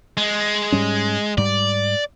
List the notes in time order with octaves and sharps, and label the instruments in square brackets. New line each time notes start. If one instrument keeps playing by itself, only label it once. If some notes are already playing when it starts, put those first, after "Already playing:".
[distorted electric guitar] G#3
[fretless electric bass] G#2 G3 C#4
[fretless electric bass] G#2 G3 [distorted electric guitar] D5